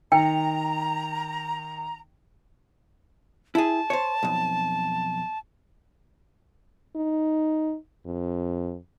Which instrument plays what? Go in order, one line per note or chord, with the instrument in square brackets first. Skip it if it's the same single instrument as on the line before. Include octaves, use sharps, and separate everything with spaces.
[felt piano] D#3 [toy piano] G5 [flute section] A#5
[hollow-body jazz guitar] E4 G#4 [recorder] A5
[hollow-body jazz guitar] C5 C#5
B1 F2
[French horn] D#4
F2